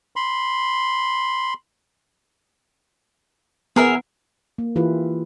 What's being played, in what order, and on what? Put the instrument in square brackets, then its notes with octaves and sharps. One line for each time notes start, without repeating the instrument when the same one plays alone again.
[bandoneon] B5 C6
[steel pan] B3 [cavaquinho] G#4 A#4 E5
[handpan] A#3
E3 E4 F4 G4 G#4 B4